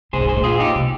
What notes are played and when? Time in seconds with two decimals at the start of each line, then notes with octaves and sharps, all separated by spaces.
0.13 C3 G#4 C5
0.21 A#2
0.28 G#2 G#4 C5
0.36 A#2
0.44 F4 G#4
0.59 D#4 G4
0.75 C3